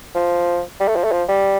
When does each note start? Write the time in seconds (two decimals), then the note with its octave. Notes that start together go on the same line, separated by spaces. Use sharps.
0.15 F3
0.80 G3
0.88 A3
0.96 F3
1.04 A3
1.12 F3
1.29 G3